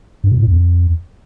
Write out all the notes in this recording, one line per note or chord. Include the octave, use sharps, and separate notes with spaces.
G2
B2
A2
F2